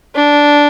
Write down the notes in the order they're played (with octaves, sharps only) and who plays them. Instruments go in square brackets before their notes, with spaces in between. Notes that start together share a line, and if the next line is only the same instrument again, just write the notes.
[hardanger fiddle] D4